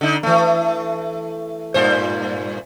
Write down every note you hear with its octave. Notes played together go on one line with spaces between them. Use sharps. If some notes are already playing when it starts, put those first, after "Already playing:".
D3 D#4
E3 A3
G2 A#2 C5